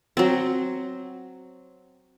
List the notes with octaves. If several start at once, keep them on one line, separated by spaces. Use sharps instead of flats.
F#3 C4